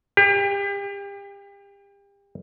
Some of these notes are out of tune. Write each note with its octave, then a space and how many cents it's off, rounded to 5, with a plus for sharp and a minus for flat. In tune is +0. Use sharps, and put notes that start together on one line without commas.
G4 +35